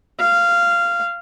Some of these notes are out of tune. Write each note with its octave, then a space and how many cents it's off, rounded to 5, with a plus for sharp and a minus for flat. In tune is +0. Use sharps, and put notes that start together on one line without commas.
F5 -15